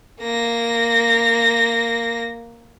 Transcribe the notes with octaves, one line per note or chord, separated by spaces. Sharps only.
A#3 A#6